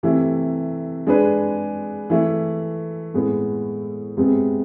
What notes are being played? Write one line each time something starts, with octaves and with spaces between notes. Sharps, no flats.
C3 E3 A3 E4
G#3 D4 G#4 B4
E3 A3 E4
A2 G#3 B3
C3 G#3 B3